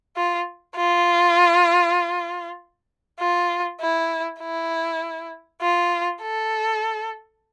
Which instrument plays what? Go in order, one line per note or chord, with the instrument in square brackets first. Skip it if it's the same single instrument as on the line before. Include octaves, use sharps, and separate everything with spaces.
[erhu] F4
F4
F4
E4
E4
F4
A4